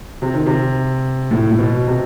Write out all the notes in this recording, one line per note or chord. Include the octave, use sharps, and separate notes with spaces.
C3
D#3
C3
A2
A2
B2
C3